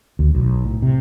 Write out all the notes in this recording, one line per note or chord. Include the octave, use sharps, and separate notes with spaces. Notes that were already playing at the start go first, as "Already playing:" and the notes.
D2
B1
A2
C3